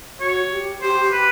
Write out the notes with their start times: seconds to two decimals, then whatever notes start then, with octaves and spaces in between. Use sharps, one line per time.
0.20 F#4 C#5
0.52 G4
0.82 G4 C5
1.02 G4
1.12 B4